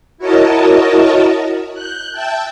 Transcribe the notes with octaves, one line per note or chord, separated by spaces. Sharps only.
E4 F#4 A#4 C#5 D#5 A5
F#6 G6
E5 G5 A5